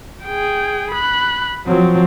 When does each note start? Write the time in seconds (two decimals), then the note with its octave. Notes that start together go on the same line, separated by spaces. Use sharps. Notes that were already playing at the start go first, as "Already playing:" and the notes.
0.24 G#4 G5
0.91 B5 F#6
1.67 F3 F#3 C4